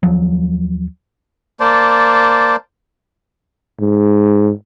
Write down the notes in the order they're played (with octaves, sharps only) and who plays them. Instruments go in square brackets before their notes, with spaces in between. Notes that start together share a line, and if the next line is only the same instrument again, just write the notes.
[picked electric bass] D#2 F3 F#3
[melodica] A#3 C5 D5 A5
[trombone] G#2